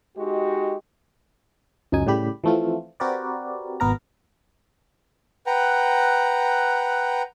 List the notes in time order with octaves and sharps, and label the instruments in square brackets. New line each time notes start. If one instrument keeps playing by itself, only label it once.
[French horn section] G#3 D#4 F#4 G4
[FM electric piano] C#2 F#2 D#4 G#5
A2 C#3 G3 G4 B5
E3 F3 A3 C4 F4
C4 F#4 G4 A#4 B4 D5
G#1 B2 B3 A#4 A#5
[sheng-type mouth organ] B4 F#5 G5 A#5